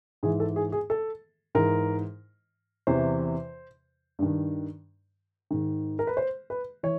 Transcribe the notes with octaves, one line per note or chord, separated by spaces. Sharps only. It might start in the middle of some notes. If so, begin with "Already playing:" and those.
G#2 E3 G#4
A4
G#4
G#4
A4
G#2 E3 A#4
E2 C3 E3 C5
G2 D#3
G#2 D#3
A#4
B4
C5
B4
E3 C#5